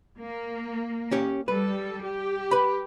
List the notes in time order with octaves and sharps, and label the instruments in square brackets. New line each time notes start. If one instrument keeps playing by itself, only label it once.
[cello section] A#3
[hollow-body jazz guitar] C#4 G4 C#5
[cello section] G3 A4 [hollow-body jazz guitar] B4
[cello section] G4
[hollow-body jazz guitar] B4 B5